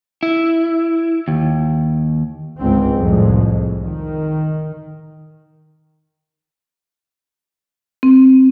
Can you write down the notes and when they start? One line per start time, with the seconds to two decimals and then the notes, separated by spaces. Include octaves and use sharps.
0.23 E4
1.28 D#2
2.60 G1 C#2 G#2 C4
2.97 C2 F2 A2 G#3
3.84 D#3
8.03 C4